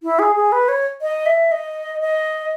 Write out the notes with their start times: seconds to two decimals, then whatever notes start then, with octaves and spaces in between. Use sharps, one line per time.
0.03 E4
0.19 G#4
0.36 G#4
0.52 B4
0.69 C#5
1.02 D#5
1.26 E5
1.52 D#5
2.01 D#5